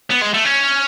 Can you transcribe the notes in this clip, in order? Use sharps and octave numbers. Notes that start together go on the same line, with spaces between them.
B3
G#3
A3
C#4